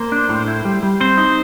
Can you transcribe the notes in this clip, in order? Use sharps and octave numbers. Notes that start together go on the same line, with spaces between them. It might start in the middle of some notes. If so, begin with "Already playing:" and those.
Already playing: A#3 C5
D4
A2
E4
G3
G3
C4 C5
D#4